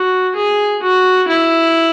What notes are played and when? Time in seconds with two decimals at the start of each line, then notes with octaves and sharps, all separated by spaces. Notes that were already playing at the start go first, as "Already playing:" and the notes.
Already playing: F#4
0.36 G#4
0.82 F#4
1.28 E4